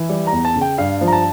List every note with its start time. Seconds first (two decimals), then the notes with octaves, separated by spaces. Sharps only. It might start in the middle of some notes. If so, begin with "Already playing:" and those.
Already playing: E3
0.09 G3
0.27 A#5
0.32 E2
0.45 A5
0.56 C#3
0.61 G5
0.78 G2 F5
1.01 F3
1.07 A#5
1.13 A5